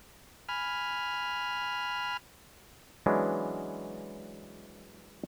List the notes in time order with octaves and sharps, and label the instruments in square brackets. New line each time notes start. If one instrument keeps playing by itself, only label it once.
[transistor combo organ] G#5 B5 F6
[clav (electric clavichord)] E3 F#3 G#3 B3 C#4 D4